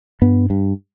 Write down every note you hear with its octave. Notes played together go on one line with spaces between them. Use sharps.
G2 B3
G2